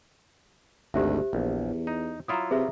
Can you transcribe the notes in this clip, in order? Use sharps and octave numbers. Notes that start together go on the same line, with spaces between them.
G#1 D2 G4 C5 E5
A#1 E2
D#4
F#3 E4 F4 A#5 D#6
C3 G#4 B4 E5